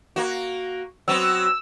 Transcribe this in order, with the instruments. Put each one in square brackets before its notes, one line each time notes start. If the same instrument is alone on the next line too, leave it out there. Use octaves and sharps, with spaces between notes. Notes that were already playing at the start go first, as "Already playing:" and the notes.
[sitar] A#3 F#4
[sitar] F#3 B3 C4 [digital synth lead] E6